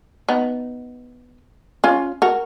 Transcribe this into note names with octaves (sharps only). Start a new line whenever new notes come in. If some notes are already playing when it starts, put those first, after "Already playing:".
B3 D#4
C#4 F4
F#4 A#4